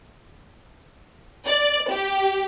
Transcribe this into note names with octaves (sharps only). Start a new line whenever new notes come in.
D5
G4